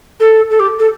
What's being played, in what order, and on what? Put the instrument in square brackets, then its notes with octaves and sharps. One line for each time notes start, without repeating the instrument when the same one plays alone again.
[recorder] A4
A4
G4
A4